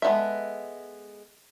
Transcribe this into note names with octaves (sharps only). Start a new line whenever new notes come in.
G#3 B3 D#4 A4 E5